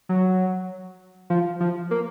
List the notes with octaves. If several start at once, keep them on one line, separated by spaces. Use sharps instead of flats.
F#3
F3
F3
A#3